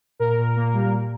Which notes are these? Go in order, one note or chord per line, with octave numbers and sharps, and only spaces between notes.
A#2 A#4
A#2
A#3
G3
A#2